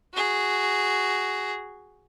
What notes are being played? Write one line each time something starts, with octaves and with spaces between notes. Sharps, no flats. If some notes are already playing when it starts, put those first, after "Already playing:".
F#4 G#4